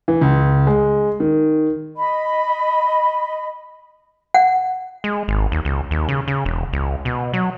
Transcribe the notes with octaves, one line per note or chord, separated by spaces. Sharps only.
E3
C#2
G#3
D#3
D#5 B5
F#5
G#3
G#1
D#2
C#2
D#2
C#3
C#3
E1
C#2
B2
F#3